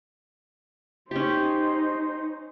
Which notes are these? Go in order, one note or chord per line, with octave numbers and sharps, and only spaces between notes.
C#4 D#4 G4 C5